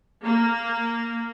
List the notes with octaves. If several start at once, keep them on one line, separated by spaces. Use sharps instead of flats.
A#3